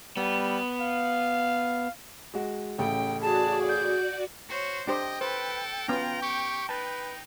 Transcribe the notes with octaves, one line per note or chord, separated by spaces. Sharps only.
G3 B3
F5
G#3 F#4
A1 C#3 A3 G5
F#4 G#4 D5 A5
G6
F#4 C5 C#5
D4 G4 C5 D#5 G5
A4 B4 C5
B3 C#4 F4 A#5
G4 C#6
D#4 B4 A5